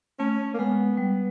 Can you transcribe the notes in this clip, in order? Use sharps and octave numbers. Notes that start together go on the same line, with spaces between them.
A3 C#4
A#3
G#3 B3
G3